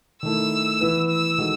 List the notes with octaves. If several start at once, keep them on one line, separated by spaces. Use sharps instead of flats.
D#3 A3 E4 E6
E3 B3 E4 B4
E6
D#3 G#3 D#4 F#4 A4